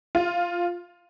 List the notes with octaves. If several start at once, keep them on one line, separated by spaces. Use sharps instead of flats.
F4